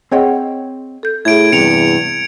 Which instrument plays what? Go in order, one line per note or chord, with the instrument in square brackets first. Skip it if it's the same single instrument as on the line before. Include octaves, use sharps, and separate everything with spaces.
[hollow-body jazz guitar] C4 C#5 G5 [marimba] G#4 D#5 F#5
[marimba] A4 G6
[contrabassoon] A2 [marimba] G#4 E5 [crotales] G#6 D7
[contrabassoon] E2 [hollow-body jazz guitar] G2 C3 [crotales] C#7 D7 F7